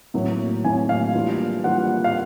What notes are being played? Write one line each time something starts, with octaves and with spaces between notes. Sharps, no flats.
A2 F#3 A#3
A2 F#3 A#3 G#5
F5
E3 G3 A#3 D4 F4
E3 G3 A#3 D4 F4 F#5
F5